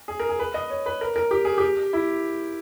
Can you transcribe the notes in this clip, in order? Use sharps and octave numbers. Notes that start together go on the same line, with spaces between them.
G#4
A#4
G#4
B4
D#5
C#5
B4
A#4
A#4
G4
G#4
G4
E4